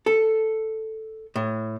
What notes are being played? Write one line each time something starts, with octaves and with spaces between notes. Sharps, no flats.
A4
A2